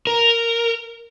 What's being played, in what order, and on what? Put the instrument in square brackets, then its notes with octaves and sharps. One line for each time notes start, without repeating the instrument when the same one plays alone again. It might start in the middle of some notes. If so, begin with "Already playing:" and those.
[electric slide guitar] A#4